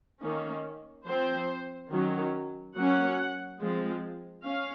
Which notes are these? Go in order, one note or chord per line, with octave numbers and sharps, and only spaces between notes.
D#3 A#3 C#4
F3 C4 C5
D#3 F#3 C#4
F#3 A#3 C#4 F#5
F3 G#3 C4
C#4 F5